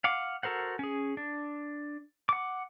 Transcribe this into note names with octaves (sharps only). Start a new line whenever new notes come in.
F5 F#5 D6
F#4 A4 A#4 C5 F#5
C#4 G#4
D4
F#5 D6